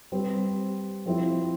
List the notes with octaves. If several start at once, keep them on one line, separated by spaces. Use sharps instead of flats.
G3 C4 G4 B4
F3 C4 E4